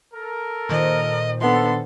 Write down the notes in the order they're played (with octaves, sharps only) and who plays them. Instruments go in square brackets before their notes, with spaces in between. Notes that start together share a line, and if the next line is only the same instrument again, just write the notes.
[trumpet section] A4 A#4
[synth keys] A#2 D#3 C5 [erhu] D#5
[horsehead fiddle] B3 D4 [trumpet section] A4 [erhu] C6